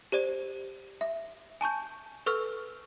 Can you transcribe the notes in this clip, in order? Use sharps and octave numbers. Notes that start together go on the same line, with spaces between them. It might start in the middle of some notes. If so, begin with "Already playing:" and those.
G4 C5 D5 D#7
E5
G#5 A5 C#6 G6
A4 B4 C#6 E6 F6